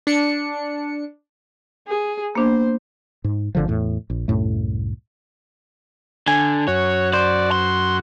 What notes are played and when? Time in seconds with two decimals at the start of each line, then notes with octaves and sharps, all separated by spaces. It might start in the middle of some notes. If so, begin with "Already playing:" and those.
0.07 D4 C#7
1.88 G#4
2.35 A#3 B3 D4 C5
3.24 G#2
3.55 G#1 D3 F3
3.68 E2 A2
4.10 A#1
4.28 C2 F#2 A2 A3
6.28 D3 G#5
6.68 F#2 F#4 C#5
7.13 C5 D5
7.52 C6